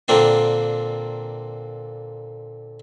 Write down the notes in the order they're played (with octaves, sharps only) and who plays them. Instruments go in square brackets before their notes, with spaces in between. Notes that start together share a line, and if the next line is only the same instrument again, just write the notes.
[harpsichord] A#2 D3 A#3 C4 D4 G5